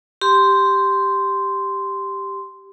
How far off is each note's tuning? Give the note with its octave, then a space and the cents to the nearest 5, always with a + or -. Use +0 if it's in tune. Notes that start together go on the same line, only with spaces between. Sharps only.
G4 +0 C6 -10